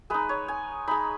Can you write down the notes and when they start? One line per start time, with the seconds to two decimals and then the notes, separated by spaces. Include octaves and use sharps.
0.10 G#3 D#4 B4
0.29 C#5
0.48 G#5
0.88 G#3 D#4 B5